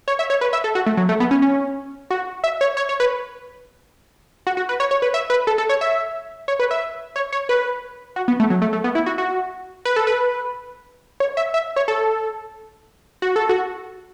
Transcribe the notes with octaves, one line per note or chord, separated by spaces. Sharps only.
C#5
E5
C#5
B4
E5
A4
F#4
A3
F#3
A3
B3
C#4
C#4
F#4
E5
C#5
C#5
C#5
B4
F#4
F#4
B4
C#5
C#5
B4
E5
B4
A4
A4
C#5
E5
C#5
B4
E5
C#5
C#5
B4
F#4
B3
A3
F#3
A3
A3
B3
E4
F#4
F#4
B4
A4
B4
C#5
E5
E5
C#5
A4
F#4
A4
F#4